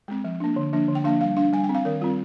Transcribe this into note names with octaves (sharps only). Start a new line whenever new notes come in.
G#3 C4
F3
A#3 D4
D3
F3 A#3 D4
D3
G5
F3 A#3 D4 F5
G3 F5
D4 F5
G3 G#5
G5
C4
F5
D#3 A#4
G3 C4 F4